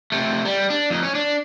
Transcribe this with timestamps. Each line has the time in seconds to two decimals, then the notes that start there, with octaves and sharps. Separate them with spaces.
0.12 C3 A3
0.45 G3
0.70 D4
0.90 F2 D#4
1.03 C#4
1.15 D4